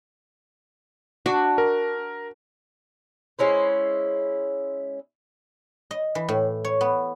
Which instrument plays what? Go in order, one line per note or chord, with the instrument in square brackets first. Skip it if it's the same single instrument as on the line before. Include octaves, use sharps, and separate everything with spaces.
[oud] D4 [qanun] F#4
[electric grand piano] A#4
[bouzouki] G#3 C#4 E4 C5
[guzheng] D#5
E3
A2
C#5
B3